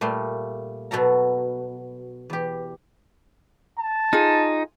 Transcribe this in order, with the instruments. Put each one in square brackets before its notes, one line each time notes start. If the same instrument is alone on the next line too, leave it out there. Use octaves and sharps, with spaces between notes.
[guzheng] A#2 G3 A3 C6
B2 F#3 A4 A#5
E2 G4
[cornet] A5
[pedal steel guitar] D#4 [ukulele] F4 G#4